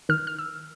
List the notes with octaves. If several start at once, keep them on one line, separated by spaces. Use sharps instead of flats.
D#3 F6
F6
E6